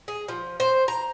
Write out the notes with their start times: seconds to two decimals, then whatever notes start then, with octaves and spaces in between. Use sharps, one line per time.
0.08 G#4
0.28 F3
0.60 C5
0.88 A#5